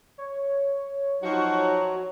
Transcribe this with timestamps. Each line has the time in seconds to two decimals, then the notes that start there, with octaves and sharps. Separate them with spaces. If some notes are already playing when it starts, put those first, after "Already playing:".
0.18 C#5
1.22 F3 F#3 D#4 F#4